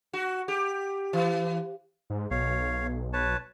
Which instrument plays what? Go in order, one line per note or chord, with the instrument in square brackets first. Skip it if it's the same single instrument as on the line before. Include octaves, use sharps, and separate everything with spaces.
[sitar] F#4
G4
E3
[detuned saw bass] G#2
[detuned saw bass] B1 [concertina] C#5 F5
[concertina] B4 C#5 A5